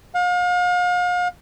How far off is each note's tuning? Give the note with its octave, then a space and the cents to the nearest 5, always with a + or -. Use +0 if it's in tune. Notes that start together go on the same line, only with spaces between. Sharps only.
F5 +40